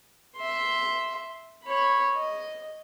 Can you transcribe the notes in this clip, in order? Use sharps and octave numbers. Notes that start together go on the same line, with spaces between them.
E5 C6
C#5 B5
D#5